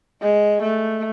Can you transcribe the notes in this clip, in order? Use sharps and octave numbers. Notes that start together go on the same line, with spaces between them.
G#3
A3